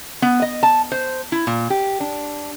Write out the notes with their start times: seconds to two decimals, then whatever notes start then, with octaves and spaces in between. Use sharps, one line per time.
0.22 B3
0.42 D#5
0.63 A5
0.92 C5
1.32 E4
1.47 A#2
1.70 G4
2.00 D4